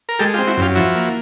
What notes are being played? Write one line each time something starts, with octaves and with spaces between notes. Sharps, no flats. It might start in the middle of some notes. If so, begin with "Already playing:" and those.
A#4
G#3 G4 A4
F4 G4
C4
E4 F#4
F#2 F4 G4
F3 E4 F#4
A#3